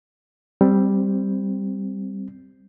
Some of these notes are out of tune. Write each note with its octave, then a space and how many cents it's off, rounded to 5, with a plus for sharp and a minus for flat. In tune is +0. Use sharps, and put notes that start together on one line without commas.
G3 +0 C4 +0